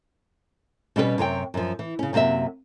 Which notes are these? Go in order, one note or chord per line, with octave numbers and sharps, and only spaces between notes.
B2 G3 C#4 G4 G#4 B4
F#2 C3 C#5 G5
F#2 F3
E3
C#3 C#4
F#2 C3 A#3 F#4 E5